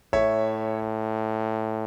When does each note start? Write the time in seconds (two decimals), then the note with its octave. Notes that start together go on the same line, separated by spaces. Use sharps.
0.13 A2 C#5 E5